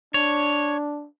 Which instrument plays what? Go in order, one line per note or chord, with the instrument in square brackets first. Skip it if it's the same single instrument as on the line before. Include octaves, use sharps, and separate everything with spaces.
[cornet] D4 [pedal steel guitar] C#5